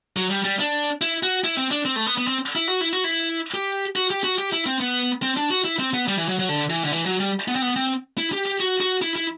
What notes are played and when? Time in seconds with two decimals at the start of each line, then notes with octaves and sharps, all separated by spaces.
0.17 F#3
0.31 G3
0.45 G3
0.59 D4
1.01 E4
1.23 F#4
1.44 E4
1.57 C4
1.71 D4
1.85 C4
1.96 A3
2.06 B3
2.18 B3
2.27 C4
2.56 E4
2.68 F#4
2.81 E4
2.93 F#4
3.04 E4
3.54 G4
3.96 F#4
4.11 G4
4.24 F#4
4.38 G4
4.53 E4
4.66 C4
4.80 B3
5.22 C4
5.37 D4
5.50 F#4
5.65 E4
5.79 C4
5.94 B3
6.08 G3
6.17 E3
6.29 F#3
6.39 F#3
6.49 D3
6.70 E3
6.84 D3
6.92 E3
7.06 F#3
7.20 G3
7.48 B3
7.56 C4
7.62 B3
7.76 C4
8.18 E4
8.33 G4
8.46 G4
8.60 F#4
8.81 F#4
9.02 E4
9.16 E4